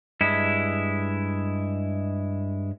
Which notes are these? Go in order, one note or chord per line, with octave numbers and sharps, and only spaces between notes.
G2 G#3 E4